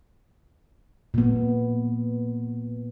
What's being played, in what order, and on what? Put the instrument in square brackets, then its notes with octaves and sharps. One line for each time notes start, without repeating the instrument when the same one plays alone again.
[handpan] A#2 B3